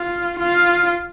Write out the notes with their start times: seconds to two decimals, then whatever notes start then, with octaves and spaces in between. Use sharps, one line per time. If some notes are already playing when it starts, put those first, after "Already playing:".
Already playing: F4
0.39 F4